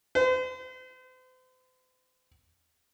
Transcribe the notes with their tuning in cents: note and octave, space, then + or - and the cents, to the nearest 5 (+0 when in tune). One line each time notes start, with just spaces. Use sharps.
C5 -40